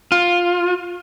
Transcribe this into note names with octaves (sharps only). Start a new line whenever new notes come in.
F4